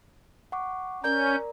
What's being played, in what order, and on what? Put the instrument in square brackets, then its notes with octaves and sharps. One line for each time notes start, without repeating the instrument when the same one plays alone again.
[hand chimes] F#5 C#6 D6
[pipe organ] C#4 [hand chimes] A#4 D5 A#5 [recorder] G6